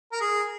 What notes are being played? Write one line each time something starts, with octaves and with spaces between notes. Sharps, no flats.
A#4
G#4